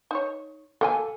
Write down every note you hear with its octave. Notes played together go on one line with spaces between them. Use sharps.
D#4 C#5
A#3 A4 G5 G#5